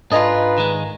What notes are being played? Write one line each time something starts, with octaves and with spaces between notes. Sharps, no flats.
G#2 D4 F4 A4 B4 D#5 G#5 A#5
D#3 G#3